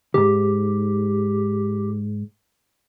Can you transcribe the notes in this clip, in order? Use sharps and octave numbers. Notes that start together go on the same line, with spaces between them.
C2 G#2 G4